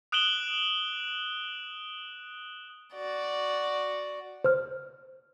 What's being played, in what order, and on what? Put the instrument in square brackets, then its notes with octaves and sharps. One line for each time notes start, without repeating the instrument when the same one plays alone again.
[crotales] D#6 F#6 D7 E7 F#7 G7
[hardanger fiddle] F#4 D5
[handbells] C5 F6